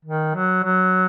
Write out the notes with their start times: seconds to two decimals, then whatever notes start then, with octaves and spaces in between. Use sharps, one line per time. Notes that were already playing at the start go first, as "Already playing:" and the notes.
0.05 D#3
0.35 F#3
0.64 F#3